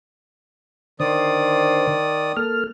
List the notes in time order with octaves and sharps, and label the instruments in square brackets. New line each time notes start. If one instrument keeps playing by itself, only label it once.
[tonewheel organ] D3 C5 [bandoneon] D#3 D5 D#6
[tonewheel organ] A#3 A4 F6